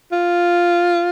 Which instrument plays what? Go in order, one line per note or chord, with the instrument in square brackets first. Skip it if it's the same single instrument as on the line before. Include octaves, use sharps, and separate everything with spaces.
[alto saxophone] F4